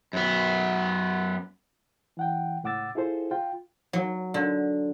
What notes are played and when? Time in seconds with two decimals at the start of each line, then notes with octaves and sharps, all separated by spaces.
0.13 F#2 B3
2.17 E3 F#5 G5
2.63 C#2 A2 F#5 D6 E6 A6
2.95 E4 F4 G#4 A4 C5
3.31 F4 G5
3.93 F#3
4.34 D3